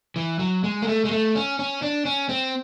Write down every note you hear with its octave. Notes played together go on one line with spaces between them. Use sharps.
E3
F#3
G#3
A#3
A3
G#3
A3
C#4
C#4
D4
C#4
C4